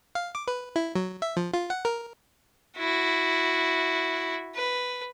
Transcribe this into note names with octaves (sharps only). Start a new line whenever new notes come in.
F5
D6
B4
E4
F#3
E5
F3
F4
F#5
A#4
E4 F#4
B4